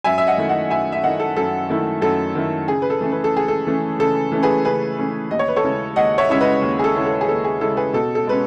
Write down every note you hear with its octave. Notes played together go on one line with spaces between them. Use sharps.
F#2 E5 G#5
E5
D#5 F#5
D#3 A3 E4
D#5 F#5
F#2 E5 G#5
E5
D#3 A3 E4 D#5 F#5
A4
F#2 A4
D#3 A3 E4
F#2 A4
D#3 A3 E4
C#3 G#4
B4
A4
E3 A3 C#4
B4
A4
C#3 G#4
A4
E3 A3 C#4
C#3 A4
E3 A3 C#4
G#4 B4
C#3 G#4 B4
E3 A3 C#4
D#2 D#5
C#5
B4
A4 C#5
C#3 G#3 C#4 E4
D#2 D#5 F#5
C#5 E5
C#3 G#3 C#4 E4 E5
B4 D#5
D#2
G#4
A4
C#3 G#3 C#4 E4
A4
G#4
D#2 A4
G#4
C#3 G#3 C#4 E4 A4
G#4 B4
B2 A4
A4
G#3 C#4 B4